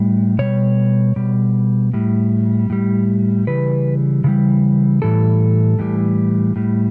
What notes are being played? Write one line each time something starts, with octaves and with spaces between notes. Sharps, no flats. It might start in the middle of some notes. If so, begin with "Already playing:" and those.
Already playing: A2 G3
B2 G3 C#5
B2 G3
A2 G3
A2 G3
C#3 E3 G3 B4
C#3 E3 G3
A2 E3 G3 A4
A2 E3 G3
A2 G3